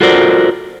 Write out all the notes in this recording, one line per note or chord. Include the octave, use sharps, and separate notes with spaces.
F4 F#4 A4 A#4 C5 D5